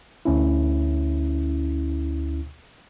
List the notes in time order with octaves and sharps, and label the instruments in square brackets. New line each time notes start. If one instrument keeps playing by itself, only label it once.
[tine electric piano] D2 C#4 E4